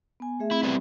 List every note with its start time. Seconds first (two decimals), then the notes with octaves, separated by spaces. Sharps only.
0.20 B3 G#5
0.40 A3 G#4 E5
0.51 C4 E4
0.63 G3 B3 E4